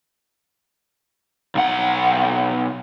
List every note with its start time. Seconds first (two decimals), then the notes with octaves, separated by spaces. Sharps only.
1.55 B1 F#5